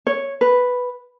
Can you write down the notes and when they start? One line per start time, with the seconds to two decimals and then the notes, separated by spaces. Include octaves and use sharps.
0.07 C#5
0.41 B4